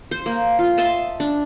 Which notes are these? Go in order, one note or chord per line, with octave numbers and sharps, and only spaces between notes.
C5
A#3
F4
D#5 E5 A5 C6
D4